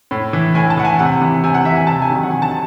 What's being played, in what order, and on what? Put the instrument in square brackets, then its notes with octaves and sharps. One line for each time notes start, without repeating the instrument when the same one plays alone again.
[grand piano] A2
E3
A2 G#5
A5
E3 F#5
G#5
C3 F#5
E3
C3 G#5
F#5
E3 E5
G#5
C3 A5
G#5
D#3 F#3
F#5
C3 G#5
A5